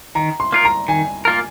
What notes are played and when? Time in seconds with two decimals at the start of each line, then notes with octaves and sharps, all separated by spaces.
0.15 D#3 A#5
0.40 C6
0.53 A#3 F4 A#4
0.65 A#5
0.88 D#3 G#5
1.25 A#3 F4 A#4